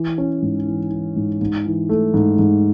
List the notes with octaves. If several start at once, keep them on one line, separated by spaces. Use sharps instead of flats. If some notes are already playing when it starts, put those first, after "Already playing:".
Already playing: E3
C#4
G#2
E3
E3
G#2
G#2
E3
A3
G#2
G#2